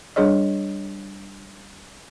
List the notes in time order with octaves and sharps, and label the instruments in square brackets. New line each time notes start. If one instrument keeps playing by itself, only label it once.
[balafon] G3 D4 G#4 C#5 D#5